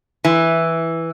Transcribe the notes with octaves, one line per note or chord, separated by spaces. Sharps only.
E3